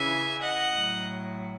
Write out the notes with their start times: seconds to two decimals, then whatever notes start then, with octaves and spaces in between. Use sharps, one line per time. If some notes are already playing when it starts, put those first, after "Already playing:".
Already playing: C#3 E3 E5 G#5
0.42 D#5 F#5
0.74 A2 F#3